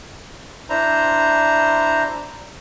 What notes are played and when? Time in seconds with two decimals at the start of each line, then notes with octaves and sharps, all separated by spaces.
0.70 D4 E4 C5 A#5